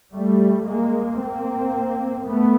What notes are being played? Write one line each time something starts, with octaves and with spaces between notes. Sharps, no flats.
G3 A3
G#3 A#3
A#3 C4
A3 B3